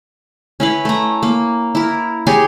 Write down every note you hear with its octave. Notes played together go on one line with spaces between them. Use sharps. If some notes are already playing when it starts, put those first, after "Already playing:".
C#4 E4 B4
A3 A#5
A#3
E4 A#4
G4 G#4 C#5 G#5